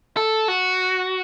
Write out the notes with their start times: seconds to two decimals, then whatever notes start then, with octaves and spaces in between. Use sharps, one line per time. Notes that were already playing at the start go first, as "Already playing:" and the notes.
0.17 A4
0.48 F#4